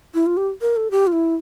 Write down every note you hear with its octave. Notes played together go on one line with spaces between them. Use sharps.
E4
F4
G4
A#4
A4
G4
F4
E4